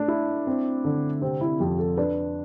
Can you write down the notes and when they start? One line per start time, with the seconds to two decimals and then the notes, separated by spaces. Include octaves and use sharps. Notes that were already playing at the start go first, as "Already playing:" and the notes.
Already playing: A3 D4
0.08 E4
0.47 C4
0.85 D3
1.21 C3 C4
1.41 E4
1.59 F2 G4
1.79 A4
1.97 D4 B4